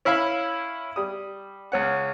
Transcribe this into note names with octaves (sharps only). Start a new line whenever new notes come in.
C#4 E4 E5 F5 B5
G3 D#6
C#2 C#4 F#5